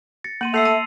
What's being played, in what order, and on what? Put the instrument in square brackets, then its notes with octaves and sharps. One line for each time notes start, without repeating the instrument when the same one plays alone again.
[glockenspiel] A6 A#6 C#7
[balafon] A#3 [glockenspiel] C6 D#7 F#7
[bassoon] A3 [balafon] A#3 [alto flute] E5 [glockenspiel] E6 C7 F7
[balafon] A5 [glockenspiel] D#7